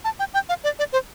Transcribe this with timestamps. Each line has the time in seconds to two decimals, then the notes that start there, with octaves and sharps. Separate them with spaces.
0.04 A5
0.19 G5
0.34 G5
0.49 F5
0.64 D5
0.79 D5
0.92 C5